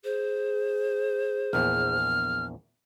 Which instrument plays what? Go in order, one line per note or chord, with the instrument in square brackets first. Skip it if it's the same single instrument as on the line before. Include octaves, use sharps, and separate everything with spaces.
[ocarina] G#4 [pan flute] C5
[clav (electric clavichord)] A#1 E2 [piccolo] F6